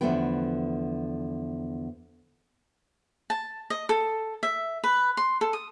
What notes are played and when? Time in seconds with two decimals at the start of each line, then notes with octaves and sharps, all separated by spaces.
0.01 E2 D3 F3 A3 B3 G5
3.30 A5
3.70 D#5
3.89 A4
4.43 E5
4.84 B4
5.17 C6
5.41 A4
5.53 D#6